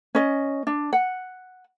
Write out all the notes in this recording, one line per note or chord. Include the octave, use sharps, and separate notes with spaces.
C#4 D#5
D4
F#5